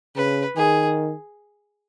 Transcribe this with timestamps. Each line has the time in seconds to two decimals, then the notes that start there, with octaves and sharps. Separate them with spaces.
0.16 C#3 B4
0.56 D#3 G#4